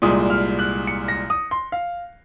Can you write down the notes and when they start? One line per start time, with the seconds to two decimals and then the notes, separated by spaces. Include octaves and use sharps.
0.02 C2 A#2 G#3 D#6
0.30 F6
0.59 F#6
0.87 C#7
1.08 A#6
1.30 D#6
1.51 C6
1.72 F5